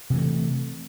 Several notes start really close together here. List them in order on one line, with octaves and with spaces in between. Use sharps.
C3 E3 A3